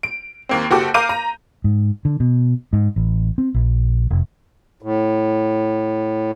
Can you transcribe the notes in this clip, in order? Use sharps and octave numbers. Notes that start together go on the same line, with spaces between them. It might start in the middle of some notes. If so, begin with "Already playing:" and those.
D7
D#2 A#3 C4
F#1 F#4 G4 A4 D6
A#4 F5 A#5 D6 G6 D#7
A#5
G#2
D3
B2
G#2
A1
C4
A#1
F1
A2